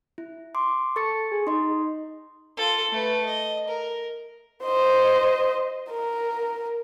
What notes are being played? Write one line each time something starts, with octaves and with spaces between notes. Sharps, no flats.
E4
C6 D6
A4 C#6 A6 C#7
G#4
D#4 D#5 C6
F4 A4
A3 B4
D#5
A#4
C5 D#5
A#4